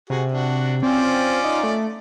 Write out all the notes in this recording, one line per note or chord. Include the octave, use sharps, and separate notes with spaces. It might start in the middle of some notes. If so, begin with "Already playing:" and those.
C3 F#4 G#4
D4 F#4
C4 C#4 F4 D5
D#4
A3